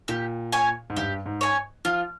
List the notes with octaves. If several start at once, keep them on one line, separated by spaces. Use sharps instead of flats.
A#2 G4
C#5 G#5
G#2
G2 G4
G#2
C#5 G#5
F3 F4